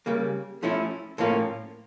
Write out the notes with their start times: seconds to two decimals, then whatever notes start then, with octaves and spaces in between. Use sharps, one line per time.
0.06 C#3 G3 A#3
0.63 F3 A3 C#4 E4
1.18 A2 F3 A#3 C#4